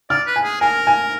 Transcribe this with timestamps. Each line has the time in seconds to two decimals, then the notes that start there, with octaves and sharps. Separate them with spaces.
0.10 D5 F6
0.27 B4
0.36 G#5
0.44 G#4
0.61 A#4 G#5
0.87 G#5